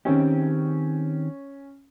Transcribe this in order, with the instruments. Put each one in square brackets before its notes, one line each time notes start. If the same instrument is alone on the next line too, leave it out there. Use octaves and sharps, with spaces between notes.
[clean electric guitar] D#3 C4 G4 [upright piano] C#4